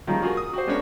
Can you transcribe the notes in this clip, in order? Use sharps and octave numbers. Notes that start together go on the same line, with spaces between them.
D#3 F3 G3 G#3 A#3 C#4
F4 F#4 G#4 A#4
D#6
F#4 G4 C5
G#3 B3 C#4 D4 A#4 C#5